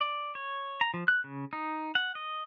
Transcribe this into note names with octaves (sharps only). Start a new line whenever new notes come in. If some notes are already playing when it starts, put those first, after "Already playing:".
D5
C#5
A#5
F3
F#6
C#3
D#4
F#5
D#5